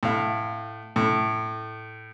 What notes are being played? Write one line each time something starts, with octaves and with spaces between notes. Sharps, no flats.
A2 F5
A2